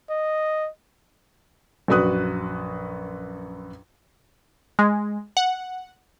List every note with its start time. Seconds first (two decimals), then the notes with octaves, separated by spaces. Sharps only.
0.10 D#5
1.88 A#1 F#2 F#4 B4 D#6 F#6
4.79 G#3
5.37 F#5